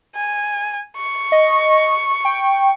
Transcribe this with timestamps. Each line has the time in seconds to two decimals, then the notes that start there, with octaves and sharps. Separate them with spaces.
0.15 G#5
0.97 C#6
1.32 D#5
2.25 G5